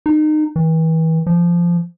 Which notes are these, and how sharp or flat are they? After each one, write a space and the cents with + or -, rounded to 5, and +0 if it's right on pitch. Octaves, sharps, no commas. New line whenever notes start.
D#4 -25
E3 -35
F3 -15